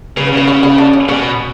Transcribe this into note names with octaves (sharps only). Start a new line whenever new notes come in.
C#3 B4
B4
C#3
E4
E4
E4
D4
C#4
B2 C#4